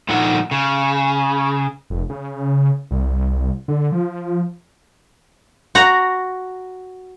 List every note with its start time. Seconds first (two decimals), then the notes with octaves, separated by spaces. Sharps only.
0.09 A#2 D3 F3 D#4 F#5
0.51 C#3
1.90 F1
2.10 C#3
2.91 C2
3.68 D3
3.92 F3
5.75 F#4 A#5